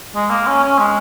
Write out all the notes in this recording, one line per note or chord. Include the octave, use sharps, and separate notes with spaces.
G#3
A#3
C#4
C#4
G#3